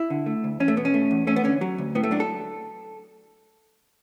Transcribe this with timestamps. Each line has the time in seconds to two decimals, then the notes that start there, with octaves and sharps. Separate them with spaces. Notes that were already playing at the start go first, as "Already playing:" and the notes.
Already playing: E4
0.10 D3
0.26 A3
0.44 D2
0.60 E2 C#4
0.68 A3
0.77 B2 B3
0.85 C#4
0.94 A3
1.11 E2
1.27 A3 C#4
1.36 B3
1.44 D3 C#4
1.61 F#3
1.78 D2
1.95 A2 B3
2.03 A3
2.11 F#3 D4
2.20 A4